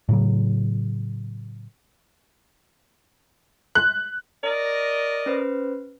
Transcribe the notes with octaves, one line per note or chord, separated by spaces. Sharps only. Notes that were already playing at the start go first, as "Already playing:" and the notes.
A2 C#3 F#3
F#6
A#4 D5 D#5
C#4 B4 C5